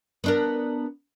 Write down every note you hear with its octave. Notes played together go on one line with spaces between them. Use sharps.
B3 D4 A#4